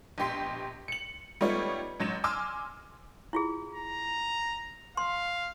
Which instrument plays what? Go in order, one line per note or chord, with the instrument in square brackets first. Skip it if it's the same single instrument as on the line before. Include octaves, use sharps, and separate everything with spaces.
[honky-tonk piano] A#1 B2 G4 C6 B6
C#7 F#7
G3 A3 B3 D#4 F4 C#5
A1 F#3 A#6 E7
G#5 C6 D6 E6 F6
[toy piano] E4 F4 G#4
[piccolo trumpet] A#5
[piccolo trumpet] F5 [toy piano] C6